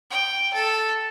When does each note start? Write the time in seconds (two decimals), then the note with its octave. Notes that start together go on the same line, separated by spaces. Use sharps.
0.10 G5
0.53 A4